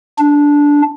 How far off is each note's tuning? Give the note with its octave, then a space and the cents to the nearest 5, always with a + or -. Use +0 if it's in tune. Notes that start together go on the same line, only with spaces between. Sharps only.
D4 -10